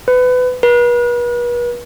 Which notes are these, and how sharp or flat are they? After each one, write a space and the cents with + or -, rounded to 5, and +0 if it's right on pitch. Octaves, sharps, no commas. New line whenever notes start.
B4 +25
B4 -40